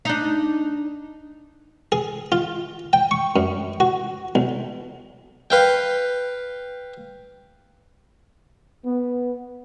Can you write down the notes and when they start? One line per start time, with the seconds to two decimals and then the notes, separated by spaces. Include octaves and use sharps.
0.05 D4 D#4
1.92 G#4
2.32 F4
2.93 G5
3.11 C#6
3.36 F#2
3.80 F#4
4.35 B1
5.50 B4 F5 G5
8.85 B3